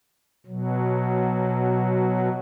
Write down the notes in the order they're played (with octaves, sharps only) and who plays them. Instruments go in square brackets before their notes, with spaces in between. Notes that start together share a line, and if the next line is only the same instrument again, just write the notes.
[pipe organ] B2 F#3